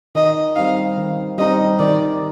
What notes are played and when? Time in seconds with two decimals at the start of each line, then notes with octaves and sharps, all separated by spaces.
0.15 D#3 D#5
0.56 G3 C4 D#4 F5
0.97 D#3
1.38 G3 C4 D#4 D#5
1.79 D#3 D5